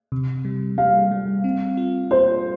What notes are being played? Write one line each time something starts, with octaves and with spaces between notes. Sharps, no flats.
C3
G3
G3 F5
G3
C4
F4
F4 C5